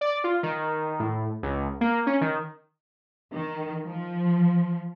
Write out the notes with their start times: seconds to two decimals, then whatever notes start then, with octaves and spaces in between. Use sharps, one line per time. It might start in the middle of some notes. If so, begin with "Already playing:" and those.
0.01 D5
0.24 F4
0.43 D#3
1.00 A2
1.43 C#2
1.81 A#3
2.07 C#4
2.21 D#3
3.33 D#3
3.85 F3